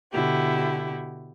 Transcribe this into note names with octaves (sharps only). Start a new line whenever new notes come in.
B2 D3 E4 F#4 G4